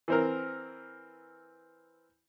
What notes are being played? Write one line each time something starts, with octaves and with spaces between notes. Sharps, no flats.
E3 C4 A#4